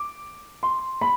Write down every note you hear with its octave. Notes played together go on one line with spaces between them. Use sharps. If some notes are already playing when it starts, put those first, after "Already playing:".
Already playing: D6
C6
B5